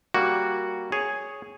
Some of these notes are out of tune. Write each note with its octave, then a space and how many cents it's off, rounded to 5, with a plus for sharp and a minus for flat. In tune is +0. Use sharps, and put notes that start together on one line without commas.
G3 +0 A#3 +0 F#4 +0
G#4 +0 C#5 +0